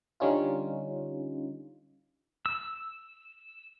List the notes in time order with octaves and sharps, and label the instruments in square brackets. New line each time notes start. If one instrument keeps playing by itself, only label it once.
[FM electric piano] D3 G3 C#4 D#4 F4
[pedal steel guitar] E6